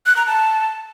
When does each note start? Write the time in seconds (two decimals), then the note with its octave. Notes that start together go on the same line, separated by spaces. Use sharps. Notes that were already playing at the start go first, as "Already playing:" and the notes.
0.06 F#6
0.16 A#5
0.27 A5